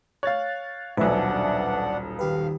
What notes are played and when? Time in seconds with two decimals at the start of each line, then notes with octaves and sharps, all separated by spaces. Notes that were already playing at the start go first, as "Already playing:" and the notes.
0.23 C#5 F5 F#6 A6
0.97 D#1 B1 D4 B4 E5 F#5 G#5
2.19 D#3 G4 B4 F5